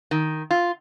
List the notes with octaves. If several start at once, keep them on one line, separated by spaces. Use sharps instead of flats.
D#3
F4